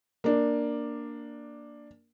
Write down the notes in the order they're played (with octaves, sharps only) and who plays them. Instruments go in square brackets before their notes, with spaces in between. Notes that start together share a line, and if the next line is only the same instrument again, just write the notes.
[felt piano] A#3 D4